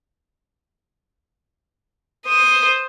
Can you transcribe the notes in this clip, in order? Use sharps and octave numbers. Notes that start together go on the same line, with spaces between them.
C5 D#6